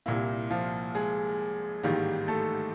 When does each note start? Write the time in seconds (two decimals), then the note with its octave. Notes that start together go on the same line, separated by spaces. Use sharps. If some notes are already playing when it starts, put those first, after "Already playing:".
0.06 C2 A#2 G3 A#3 E4
0.51 F3 F4
0.95 G#3 G#4
1.83 A1 G#2 D#3 G3 A#3 G4
2.28 A3 A4